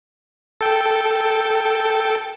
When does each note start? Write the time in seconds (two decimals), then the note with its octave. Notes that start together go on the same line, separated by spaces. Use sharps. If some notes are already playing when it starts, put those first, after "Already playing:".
0.61 A4 G5